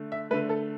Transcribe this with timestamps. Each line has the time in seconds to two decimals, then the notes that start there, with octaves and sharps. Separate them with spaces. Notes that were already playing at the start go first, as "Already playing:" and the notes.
Already playing: D3 A3
0.12 E5
0.31 A3 B4
0.33 D3
0.49 A4